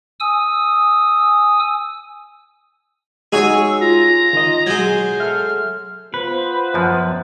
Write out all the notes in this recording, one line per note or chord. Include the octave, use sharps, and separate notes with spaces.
G#5 D#6 E6
G#3 D#4 F#4 G#4 C#5 G#5 E6
F4 A#5
D#3 D#5
B2 F#3 G#3 C5 D#6 G#6
A4 E5 F6
B3 F4 B4 C5
F#2 F3